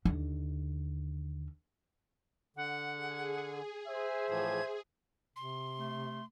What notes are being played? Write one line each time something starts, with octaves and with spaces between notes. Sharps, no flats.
D#2 D3
D3 F#5
G#4
C5 E5 G#5
A2 E3 F3 G#6
C3 C6
A3